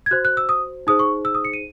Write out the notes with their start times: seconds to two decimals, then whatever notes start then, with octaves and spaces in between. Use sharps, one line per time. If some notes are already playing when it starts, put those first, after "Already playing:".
0.06 G#6
0.11 F#4 C5 F#6
0.25 F#6
0.37 E6
0.49 D#6
0.87 D#4 G#4 C5 D#6
0.99 C#6
1.25 E6
1.35 D#6
1.45 C#7
1.53 D#7